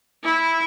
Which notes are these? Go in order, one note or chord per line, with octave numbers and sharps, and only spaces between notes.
E4